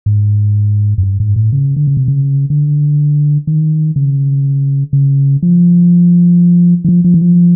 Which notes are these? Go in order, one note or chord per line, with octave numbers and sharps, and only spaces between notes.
G#2
F#2
G2
G#2
A2
C#3
D3
C#3
C3
C#3
D3
D#3
C#3
C#3
F3
E3
F3
F3
E3
F3